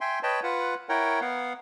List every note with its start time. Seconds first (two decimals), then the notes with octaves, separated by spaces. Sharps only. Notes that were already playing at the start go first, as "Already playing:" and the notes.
0.01 E5 G5 G#5 C6
0.23 B4 C#5 D#5 G5 A5 B5
0.43 F4 B4 F#5
0.89 E4 A#4 C#5 F#5 G5
1.21 B3 F5 F#5